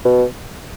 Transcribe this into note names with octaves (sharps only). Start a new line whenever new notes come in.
B2